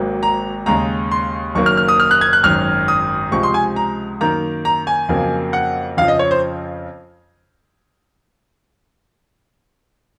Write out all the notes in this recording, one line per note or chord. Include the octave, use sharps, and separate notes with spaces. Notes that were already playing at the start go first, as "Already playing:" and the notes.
Already playing: G#1 G#2 F#3 A#3
A#5
D#2 C#3 G#3 A#5
C6
F#1 F#2 D#3 F#3 A#3 C#6
F6
F6
D#6
F6
F#6
G#6
F#6
G#1 F#2 D#3 F#3 F6
D#6
C#2 C3 F3 G#3 C#6
C6
G#5
A#5
F#2 D#3 A#3 A#5
A#5
G#5
F2 C#3 F#3 A#3
F#5
F2 C#3 F3 F5
D#5
C#5
C5